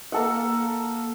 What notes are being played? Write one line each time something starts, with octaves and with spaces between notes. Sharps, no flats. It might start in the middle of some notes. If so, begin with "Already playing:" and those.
A#3 A4 F#5